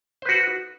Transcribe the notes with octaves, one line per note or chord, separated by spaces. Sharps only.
F#4 B4 C5